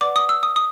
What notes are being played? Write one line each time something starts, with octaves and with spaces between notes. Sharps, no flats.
B4 D5 F#5 D6
D#6
E6
D#6
D#6